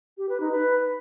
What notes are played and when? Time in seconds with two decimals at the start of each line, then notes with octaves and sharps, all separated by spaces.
0.18 G4
0.29 B4
0.40 D#4
0.52 B4